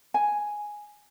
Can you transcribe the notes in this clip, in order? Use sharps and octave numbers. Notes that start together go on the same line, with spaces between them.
G#5